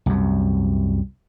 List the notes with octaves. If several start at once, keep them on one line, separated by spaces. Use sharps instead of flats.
C2 F#2